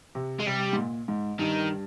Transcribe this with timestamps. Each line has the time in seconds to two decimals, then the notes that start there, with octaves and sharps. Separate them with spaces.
0.15 C3
0.39 G#3
0.46 C3 G3
0.73 G#2
0.77 A#2
1.08 G#2
1.39 G2 D#3